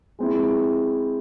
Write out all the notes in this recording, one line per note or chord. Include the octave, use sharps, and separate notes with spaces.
G#3 C4 E4